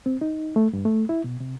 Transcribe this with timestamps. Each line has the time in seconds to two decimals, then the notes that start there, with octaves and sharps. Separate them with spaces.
0.06 C4
0.21 D#4
0.56 A3
0.73 G2
0.85 A3
1.09 E4
1.24 B2
1.40 C3